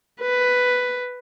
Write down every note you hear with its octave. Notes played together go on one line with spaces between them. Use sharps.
B4